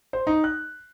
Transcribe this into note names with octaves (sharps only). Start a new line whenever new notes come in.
C5
D#4
F#6